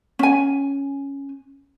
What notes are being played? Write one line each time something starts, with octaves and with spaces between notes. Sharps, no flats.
C#4 G#5